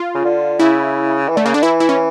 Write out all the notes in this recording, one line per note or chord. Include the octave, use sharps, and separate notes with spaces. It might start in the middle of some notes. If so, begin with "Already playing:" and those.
Already playing: F4
C#3
D3
C#3 E4
E3
D3 A3
C#3 A#3
D3 D4
E3 E4
E4
C#4